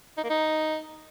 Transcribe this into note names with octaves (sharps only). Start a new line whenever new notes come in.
D#4
A#3
D#4